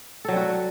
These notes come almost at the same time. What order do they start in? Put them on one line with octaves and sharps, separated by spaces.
A4 F#3 G3 F#4